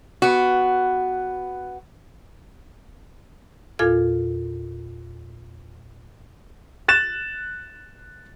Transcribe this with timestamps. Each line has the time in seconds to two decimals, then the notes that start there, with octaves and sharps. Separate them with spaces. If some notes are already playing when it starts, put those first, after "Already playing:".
0.22 B3 F#4
3.79 E2 A#2 F4 A4 F5 G#6
6.88 F#6 A6 E7